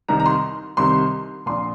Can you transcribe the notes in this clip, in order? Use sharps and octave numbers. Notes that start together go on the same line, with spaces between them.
C2 C3 D#3 A#5
A#5
C6
C2 C3 D#3 C6
A#1 A#2 C6